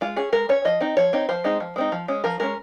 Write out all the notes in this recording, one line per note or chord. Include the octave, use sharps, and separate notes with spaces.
G#3 F4
C#4 G#4
G#3 A#4
C#4 C#5
F3 D#5
C4 D#4
F3 C#5
C4 D#4
F3 C5
G#3 C4 D#4
F3
G#3 C4 D#4
F3
G#3 C#4
F3 A#4
G#3 C#4 A#4